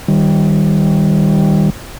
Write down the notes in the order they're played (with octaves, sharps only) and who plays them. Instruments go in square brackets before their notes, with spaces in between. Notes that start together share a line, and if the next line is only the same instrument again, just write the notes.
[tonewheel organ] D#3 G3